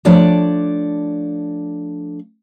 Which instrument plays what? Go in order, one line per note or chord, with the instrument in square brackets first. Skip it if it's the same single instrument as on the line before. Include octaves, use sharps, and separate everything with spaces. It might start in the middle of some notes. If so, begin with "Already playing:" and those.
[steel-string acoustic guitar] F3 A3 D4 C#5 D5 A5